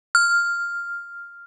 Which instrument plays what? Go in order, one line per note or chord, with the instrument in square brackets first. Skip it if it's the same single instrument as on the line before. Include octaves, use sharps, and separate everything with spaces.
[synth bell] F6